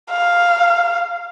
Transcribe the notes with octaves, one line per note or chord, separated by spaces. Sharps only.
F5